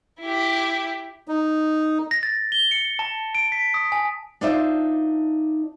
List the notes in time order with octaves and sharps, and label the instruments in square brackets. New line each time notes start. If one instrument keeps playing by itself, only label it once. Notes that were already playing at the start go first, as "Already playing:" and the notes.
[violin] E4 G4
[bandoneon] D#4
[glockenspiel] A#6
A6
G7
C#7
A5
D7
B6
D#6
G#5
[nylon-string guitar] D4 D#4 F4 C5 D5 E5